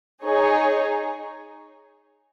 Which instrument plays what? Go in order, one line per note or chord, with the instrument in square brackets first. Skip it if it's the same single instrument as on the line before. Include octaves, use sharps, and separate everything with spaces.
[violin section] D#4 G#4 C#5